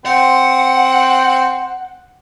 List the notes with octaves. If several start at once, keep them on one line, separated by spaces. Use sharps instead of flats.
C4 F#5